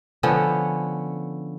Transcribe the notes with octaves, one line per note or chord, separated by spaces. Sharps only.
D3 F3 B3 C#4